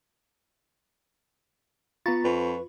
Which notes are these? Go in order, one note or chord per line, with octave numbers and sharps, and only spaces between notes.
B3 F4 A#5 B5 C#6 A6
F2 B4